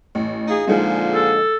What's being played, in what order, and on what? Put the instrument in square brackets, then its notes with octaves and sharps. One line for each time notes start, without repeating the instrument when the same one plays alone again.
[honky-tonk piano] A1
[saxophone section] D#4 F4 G#4
[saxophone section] A#2 D3 F3 [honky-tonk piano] G#3 D#4 G#4
[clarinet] A4